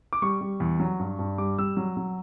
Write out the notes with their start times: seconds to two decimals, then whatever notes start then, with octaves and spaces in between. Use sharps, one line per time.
0.13 D6
0.22 G3 C#6
0.41 G3
0.60 E2
0.80 F#3
0.99 G2
1.19 G2
1.38 G3 D6
1.58 G3 E6
1.77 F#3
1.97 F#3